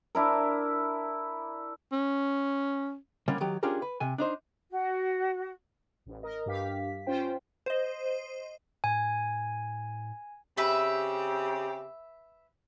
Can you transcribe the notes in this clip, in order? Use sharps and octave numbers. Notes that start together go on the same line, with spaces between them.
D4 E4 A#4
C#4
D3 G3 A#3 C#4
D#3 F#3 G4
C#4 D4 F4 G4 G#4 A#4
B4
C3 G#5
D4 D#4 C5
F#4
A1
A#4 D#5
G2 G4 F5 B6
C#4 F4 C5 G5
C5 D#5
A2 G#5
C#3 C4 G4 B4 E5